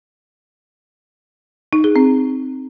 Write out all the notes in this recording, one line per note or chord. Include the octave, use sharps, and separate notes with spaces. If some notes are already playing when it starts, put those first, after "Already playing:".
D#4
G#4
C4